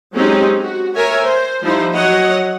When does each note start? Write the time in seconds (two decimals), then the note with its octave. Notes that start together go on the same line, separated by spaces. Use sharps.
0.13 F#3 G#3 C4 C#4 D#4 G4
0.61 F#4
0.95 A#4 C#5 E5 G#5
1.24 C5
1.62 F3 G3 D#4 E4 C5
1.93 F#3 C#5 D#5 F#5